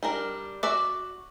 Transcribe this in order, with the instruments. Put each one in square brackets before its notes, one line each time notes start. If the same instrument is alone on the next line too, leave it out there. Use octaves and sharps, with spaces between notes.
[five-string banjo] G3 D4 A#4
[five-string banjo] F#4 D5 E5 [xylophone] D6